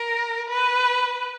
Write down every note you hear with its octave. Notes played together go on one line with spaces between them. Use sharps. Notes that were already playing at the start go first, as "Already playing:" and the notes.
Already playing: A#4
B4